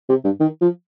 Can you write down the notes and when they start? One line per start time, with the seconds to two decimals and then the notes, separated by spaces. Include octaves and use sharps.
0.09 C3
0.24 G2
0.40 D#3
0.61 F3